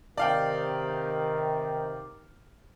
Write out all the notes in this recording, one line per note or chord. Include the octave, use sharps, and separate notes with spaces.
C3 D#3 D5 F5 G5